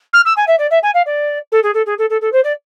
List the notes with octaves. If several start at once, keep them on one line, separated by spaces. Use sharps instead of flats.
F6
E6
G#5
E5
D5
E5
G#5
F5
D5
A4
G#4
A4
G#4
A4
A4
A4
C5
D5